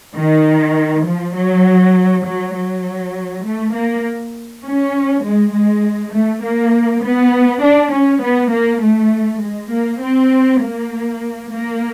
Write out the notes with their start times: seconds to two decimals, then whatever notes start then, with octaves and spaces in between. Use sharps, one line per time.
0.15 D#3
1.05 F3
1.34 F#3
2.25 F#3
2.54 F#3
3.44 A3
3.73 A#3
4.63 C#4
5.24 G#3
5.53 G#3
6.12 A3
6.43 A#3
7.02 B3
7.62 D4
7.92 C#4
8.22 B3
8.51 A#3
8.81 A3
9.41 G#3
9.71 A#3
10.01 C4
10.61 A#3
11.50 A#3